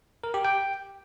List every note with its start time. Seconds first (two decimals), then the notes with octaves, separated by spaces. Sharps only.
0.24 A#4
0.34 G4
0.45 G5